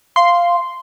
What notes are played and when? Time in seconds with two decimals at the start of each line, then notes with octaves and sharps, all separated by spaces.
0.16 F5 C6